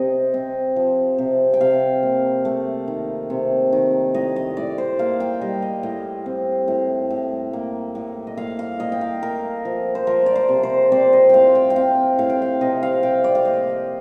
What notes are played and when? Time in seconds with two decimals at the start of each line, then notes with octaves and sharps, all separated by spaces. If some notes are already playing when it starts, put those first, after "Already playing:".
Already playing: C3 C4 D#5 G5
0.34 C4
0.76 F3
1.18 C3
1.54 G5
1.60 C3 F5
2.03 A#3
2.45 A3
2.88 D#3
3.30 C3
3.73 D#3
4.14 A2 D#5
4.36 D#5
4.57 A2 D5
4.78 C5
4.99 A#3 F5
5.20 G5
5.41 G3 D#5
5.62 D#5
5.83 A2 D#5
6.26 C4
6.68 A2
7.10 A2
7.53 A#3
7.95 A2
8.27 D#5
8.37 A#3 F5
8.59 F5
8.80 A#3 D#5
8.92 G5
9.01 F5
9.22 A3 A#4
9.65 F3
9.95 C5
10.07 F3 A#4
10.26 D5
10.35 C5
10.49 C3
10.63 C5
10.92 C4 D5
11.13 D#5
11.29 A2 F5 G5
11.55 G5
11.70 G5
11.76 C4 F5
12.19 A2 F5
12.29 G5
12.42 F5
12.61 C3 D#5
12.83 F5
13.03 C3 G5
13.24 D5
13.35 F5
13.45 A#3 D#5